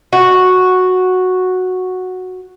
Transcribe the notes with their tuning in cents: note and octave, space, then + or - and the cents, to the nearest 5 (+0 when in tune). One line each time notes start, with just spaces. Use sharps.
F#4 -5